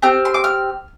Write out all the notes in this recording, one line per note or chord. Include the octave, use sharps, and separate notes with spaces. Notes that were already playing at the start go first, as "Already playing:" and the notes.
C4 G4 F6
C6
D6
F6